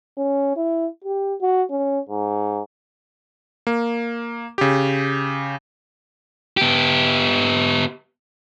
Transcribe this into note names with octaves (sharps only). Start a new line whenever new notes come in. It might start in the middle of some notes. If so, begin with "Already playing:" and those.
C#4
E4
G4
F#4
C#4
G#2
A#3
C#3 G4
B3 G4